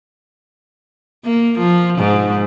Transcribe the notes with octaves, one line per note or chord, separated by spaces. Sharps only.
A#3
F3
G#2